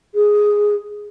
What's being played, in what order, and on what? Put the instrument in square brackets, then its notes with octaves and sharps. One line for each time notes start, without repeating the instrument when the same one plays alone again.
[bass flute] G#4